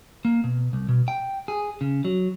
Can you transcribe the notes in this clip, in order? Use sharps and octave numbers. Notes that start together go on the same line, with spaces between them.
A#3
B2
C2
B2
G5
G#4
C#3
F#3